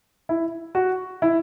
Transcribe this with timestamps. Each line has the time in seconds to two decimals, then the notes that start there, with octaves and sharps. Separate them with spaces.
0.29 E4
0.75 F#4
1.22 E4